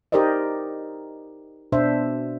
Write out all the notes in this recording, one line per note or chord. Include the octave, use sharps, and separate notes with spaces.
D#4 G4 A#4 C5 D5 D#5
B2 D4 C5 E5